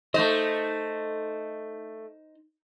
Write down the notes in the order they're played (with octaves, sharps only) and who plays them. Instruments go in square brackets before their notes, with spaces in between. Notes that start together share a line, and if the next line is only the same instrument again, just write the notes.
[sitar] A3 D#5 [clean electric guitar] D#4 C5